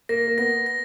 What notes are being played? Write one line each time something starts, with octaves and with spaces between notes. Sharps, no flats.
A#3 A#6
A#3
B3 A#6
A#6